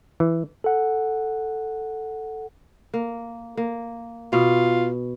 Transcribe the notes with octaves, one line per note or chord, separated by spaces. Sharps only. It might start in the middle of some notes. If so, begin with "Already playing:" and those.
E3
A4 F#5
A#3
A#3
B2 F4